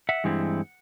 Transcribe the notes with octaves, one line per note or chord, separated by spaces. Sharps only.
E5 F#5
G2 E3 G#3 C4 E4